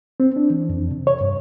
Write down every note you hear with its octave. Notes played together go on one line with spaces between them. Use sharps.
C4
D4
E3
F2
C3
C#5
G2